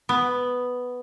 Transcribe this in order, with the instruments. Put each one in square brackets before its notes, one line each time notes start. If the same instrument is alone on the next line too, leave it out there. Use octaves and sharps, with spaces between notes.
[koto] B3